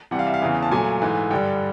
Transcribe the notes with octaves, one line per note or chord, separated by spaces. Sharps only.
C3 E3 G3 F#5
F5
E5
F5
E2 C#3 E3
A5
A#2 F#3 A3 G#5
G#2 E3 A3
G2 D3 G3 G5